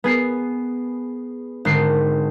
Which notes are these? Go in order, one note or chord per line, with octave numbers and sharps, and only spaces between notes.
B3 G#4 C7
G#1 D3 C7